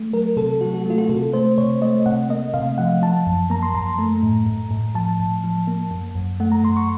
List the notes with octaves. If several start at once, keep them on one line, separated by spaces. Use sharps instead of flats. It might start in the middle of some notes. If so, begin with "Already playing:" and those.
Already playing: A3
F#3 A#4
C3 A4
F#3 F#4
F#4
A3 F4
F#4
C3 A4
A3 C5
C3 C#5
A3 D#5
C3 F#5
A#3 D#5
C3 F5
F3 F#5
F3 A5
F#2
A#3 A#5
C6
F#2 A#5
A3
A2
A2
A2
F3 A5
A2
F3
A#3
F#2
F#2
A3 F#5
A#5
F#2 C6
C#6